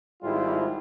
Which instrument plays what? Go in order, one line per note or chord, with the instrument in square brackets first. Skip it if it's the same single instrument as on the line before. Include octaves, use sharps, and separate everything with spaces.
[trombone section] G#1 G#2 G3 G#3 E4 F4